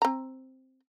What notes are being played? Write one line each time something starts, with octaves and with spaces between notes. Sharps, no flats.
C4 A#5